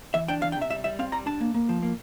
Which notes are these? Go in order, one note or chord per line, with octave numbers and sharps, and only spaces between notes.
E3 E5
D4 G5
E3 F5
G5
C3 E5
G3 E5
G3 E5
C4 F5
G3 A#5
D4 A5
A#3
A#3
F3
A#3